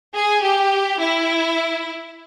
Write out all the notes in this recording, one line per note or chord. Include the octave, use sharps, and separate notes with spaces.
G#4
G4
E4